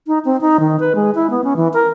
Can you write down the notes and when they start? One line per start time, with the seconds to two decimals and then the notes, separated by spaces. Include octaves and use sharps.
0.07 D#4
0.25 C4
0.41 D#4
0.60 D#3
0.80 B4
0.95 G#3
1.15 E4
1.30 B3
1.44 C#4
1.56 E3
1.74 A#4